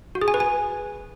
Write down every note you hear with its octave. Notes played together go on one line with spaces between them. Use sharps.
F#4
G#4
G#5
B4
G#5